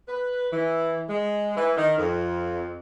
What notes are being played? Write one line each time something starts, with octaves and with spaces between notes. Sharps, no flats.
B4
E3
G#3
E3
D#3
F2